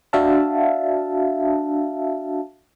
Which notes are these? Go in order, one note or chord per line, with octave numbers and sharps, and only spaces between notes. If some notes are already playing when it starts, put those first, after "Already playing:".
D4 F#4 E5 F5 A5